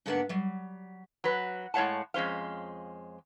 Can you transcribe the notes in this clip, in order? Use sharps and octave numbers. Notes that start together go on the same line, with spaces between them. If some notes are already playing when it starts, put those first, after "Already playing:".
G#2 D3 A#3 B3 G4 F#5
F#3 G3
F#3 B4
A2 G#3 C#5 F5 F#5 A5
F2 G#3 C#4 C5 F5